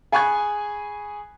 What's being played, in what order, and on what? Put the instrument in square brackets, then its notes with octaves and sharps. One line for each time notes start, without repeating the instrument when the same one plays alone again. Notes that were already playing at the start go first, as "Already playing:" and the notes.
[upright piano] G#4 G#5 B5 C#6 F#6 G#6